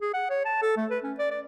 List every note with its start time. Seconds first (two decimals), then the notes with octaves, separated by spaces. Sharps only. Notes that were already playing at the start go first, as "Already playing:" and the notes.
0.01 G#4
0.14 F#5
0.30 C#5
0.45 A5
0.62 A4
0.77 A3
0.90 B4
1.03 C#4
1.19 D5
1.31 D5